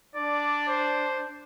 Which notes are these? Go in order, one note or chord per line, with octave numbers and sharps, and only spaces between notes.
D4 D5
C5